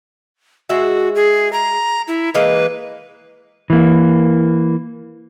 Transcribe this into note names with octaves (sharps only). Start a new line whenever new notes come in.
G#3 F#4 E5
G#4
A#5
E4
E3 G#3 A#3 B4
E3 A#3